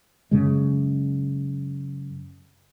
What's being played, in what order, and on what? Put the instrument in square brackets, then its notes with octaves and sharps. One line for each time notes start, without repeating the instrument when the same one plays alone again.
[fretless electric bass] F#2 C#3 G#3